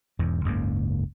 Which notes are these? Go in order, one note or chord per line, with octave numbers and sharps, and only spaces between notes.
E1 E2 G#2
F#1 C#2 G#2 A#3